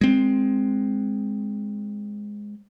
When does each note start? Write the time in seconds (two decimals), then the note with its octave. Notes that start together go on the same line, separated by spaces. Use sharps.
0.01 G#3 C4